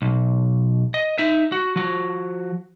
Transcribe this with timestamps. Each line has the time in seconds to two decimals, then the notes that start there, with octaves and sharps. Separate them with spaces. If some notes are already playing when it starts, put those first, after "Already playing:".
0.02 B1
0.94 D#5
1.18 D#4 E5
1.52 F#4
1.76 F3 F#4